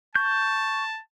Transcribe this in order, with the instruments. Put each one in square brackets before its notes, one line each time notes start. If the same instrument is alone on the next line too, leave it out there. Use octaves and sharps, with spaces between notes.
[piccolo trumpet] A5 [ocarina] C#6 [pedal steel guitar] G6